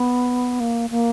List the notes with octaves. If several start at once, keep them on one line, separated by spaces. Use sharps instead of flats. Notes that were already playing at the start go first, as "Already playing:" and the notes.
Already playing: B3
A#3
A#3